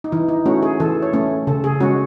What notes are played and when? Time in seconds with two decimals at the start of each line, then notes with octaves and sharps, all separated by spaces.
0.04 D#4
0.12 E3 E4
0.28 D#4
0.46 A3 C#4 F#4
0.63 G#4
0.80 E3 A4
1.02 C#5
1.13 A3 C#4
1.47 C#3 A4
1.64 G#4
1.81 G#3 C#4 F#4